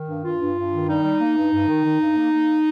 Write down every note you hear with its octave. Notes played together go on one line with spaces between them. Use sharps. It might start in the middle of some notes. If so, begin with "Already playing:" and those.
Already playing: D#3
G2
G2 F4
G2
G2
D#3
G3 D#4
G3
A#3
G2
G2
D#3
D#3
G2
A#3
A#3